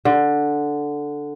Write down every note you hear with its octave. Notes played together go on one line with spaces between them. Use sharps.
D3